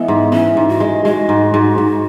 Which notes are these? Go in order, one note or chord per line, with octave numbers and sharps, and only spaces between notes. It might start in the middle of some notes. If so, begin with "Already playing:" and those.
Already playing: E3 G#3 B3
G#2
E3 C#4
G#2
F#4
G#3
G#3 F#4
G#2
G#2
G#2